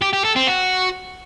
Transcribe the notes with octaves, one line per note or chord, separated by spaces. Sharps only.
G4
G4
A4
C4
F#4